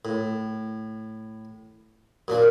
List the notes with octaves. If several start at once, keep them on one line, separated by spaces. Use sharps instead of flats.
A2
F#2 A#2 D4